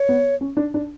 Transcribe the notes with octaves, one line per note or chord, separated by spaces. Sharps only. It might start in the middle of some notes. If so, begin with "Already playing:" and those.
Already playing: C#5
B3
C#4
D4
D4